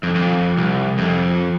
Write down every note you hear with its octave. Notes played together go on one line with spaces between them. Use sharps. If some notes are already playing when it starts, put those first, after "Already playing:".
F2
F2
C2
F2